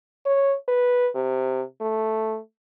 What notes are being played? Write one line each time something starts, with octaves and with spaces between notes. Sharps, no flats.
C#5
B4
C3
A3